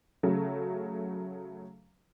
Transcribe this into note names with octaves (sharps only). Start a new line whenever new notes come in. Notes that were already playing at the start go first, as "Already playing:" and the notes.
C#3 F#3 A3